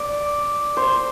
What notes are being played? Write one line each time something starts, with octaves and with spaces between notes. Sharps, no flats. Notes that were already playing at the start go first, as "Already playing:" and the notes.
Already playing: D5
C5